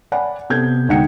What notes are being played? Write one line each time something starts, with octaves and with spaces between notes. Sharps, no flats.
D5 F#5 G#5 B5
C3 B3 A4 G6 G#6
D2 G#2 D#4 F#5 G5 C#7